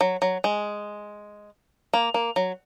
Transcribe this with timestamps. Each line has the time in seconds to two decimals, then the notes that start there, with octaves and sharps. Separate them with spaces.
0.01 F#3
0.22 F#3
0.44 G#3
1.94 A#3
2.14 A#3
2.36 F#3